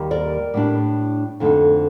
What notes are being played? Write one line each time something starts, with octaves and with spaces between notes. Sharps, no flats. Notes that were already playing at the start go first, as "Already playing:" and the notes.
Already playing: D#2 D#3 G3
A#4 D5
A2 G3 D4
F2 D3 A3 C4 D#4